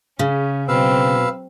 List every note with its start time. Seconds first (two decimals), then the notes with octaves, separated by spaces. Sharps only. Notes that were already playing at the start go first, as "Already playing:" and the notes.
0.19 C#3 C#4
0.68 B2 F#3 C4 B4 F5 E6